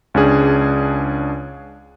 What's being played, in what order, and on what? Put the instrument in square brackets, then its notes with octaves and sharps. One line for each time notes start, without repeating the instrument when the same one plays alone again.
[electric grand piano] C#2 C#4 D4 G#4